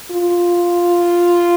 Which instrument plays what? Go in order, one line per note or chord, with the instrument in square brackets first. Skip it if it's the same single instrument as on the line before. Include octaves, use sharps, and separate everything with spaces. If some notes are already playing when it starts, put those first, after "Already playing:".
[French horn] F4